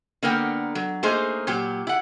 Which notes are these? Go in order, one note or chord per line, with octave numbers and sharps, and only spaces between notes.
D3 A#3 B3 A#4 G5
F#3
A3 A#3 D#4 G#4 C5
A#2 F#3 G4
E4 F#5